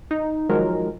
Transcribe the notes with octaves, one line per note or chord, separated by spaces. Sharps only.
D#4
D#3 F3 F#3 G#3 A#4